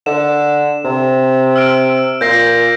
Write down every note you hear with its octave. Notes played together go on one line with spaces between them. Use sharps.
D3 E7
C3
E6 F6 D7
A#2 G6 A#6 C7